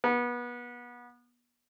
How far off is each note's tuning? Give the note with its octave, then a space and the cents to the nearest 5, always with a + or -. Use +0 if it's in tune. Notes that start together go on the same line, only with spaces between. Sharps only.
B3 -25